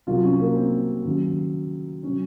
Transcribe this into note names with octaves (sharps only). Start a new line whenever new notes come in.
C2 C3 F#3 F4
C#4
A#3
C4
D#2 C#3 F#3
C3 F#3 C#4